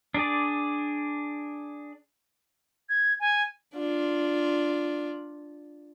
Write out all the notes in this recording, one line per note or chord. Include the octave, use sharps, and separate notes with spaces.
D4 G#4 D5
G#6
G#5
D4 F4